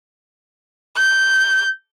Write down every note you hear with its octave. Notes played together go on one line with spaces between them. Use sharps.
G6